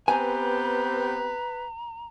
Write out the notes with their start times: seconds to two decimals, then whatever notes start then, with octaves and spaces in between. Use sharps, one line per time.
0.08 B3 C4 G4 B4 G#5 A#5